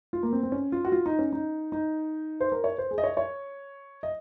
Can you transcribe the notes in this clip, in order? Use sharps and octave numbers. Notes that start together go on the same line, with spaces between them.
F4
A#3
C4
C4
C#4
F4
F#4
F4
D#4
C#4
D#4
D#4
C5
A#4
C#5
C5
G#4
D#5
C#5
C#5
D#5